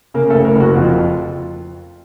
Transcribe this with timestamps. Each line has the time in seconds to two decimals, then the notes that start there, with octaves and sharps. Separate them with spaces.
0.14 C#3 A#3 A#4
0.30 A3 A4
0.35 F#1
0.45 A#3 A#4
0.55 F#1
0.60 F#4
0.75 F2 F4